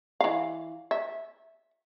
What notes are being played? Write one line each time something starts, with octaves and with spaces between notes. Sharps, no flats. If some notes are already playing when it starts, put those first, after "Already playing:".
E3 F5
E5